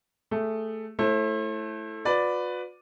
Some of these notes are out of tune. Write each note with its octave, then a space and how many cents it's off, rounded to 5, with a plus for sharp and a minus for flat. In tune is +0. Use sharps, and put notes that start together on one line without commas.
A3 +0 G#4 -10
A3 +0 E4 +0 C5 +45
F#4 -45 B4 +10 D5 +0